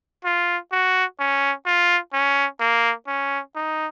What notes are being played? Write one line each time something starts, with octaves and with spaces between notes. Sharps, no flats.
F4
F#4
C#4
F4
C#4
A#3
C#4
D#4